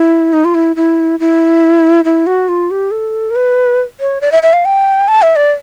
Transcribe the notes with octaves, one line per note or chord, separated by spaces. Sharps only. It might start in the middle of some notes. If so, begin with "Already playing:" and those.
Already playing: E4
D#4
F4
E4
E4
E4
E4
F#4
F4
G4
A4
A#4
B4
C#5
D5
E5
E5
F5
G5
A5
E5
D5